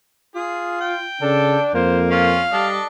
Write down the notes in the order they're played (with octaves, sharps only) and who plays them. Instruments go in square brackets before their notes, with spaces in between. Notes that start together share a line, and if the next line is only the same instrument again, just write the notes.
[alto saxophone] F4 [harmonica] G#4
[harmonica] G5
[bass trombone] C#3 [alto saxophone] D4 [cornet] A4
[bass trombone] F2 [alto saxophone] A#3 [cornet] C5
[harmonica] C#4 F4 [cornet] F5
[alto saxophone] G3 [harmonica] D4 A4 D#5